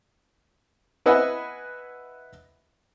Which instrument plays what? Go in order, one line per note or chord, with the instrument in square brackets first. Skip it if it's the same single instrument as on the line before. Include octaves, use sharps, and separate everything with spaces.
[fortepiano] E4 B4 D#5 E5 F#5 G#5